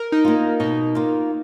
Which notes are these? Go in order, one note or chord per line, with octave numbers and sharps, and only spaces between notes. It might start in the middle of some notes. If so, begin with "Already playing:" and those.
Already playing: A#4
D#4
A#3 F4
B2 D#4
A#3 F4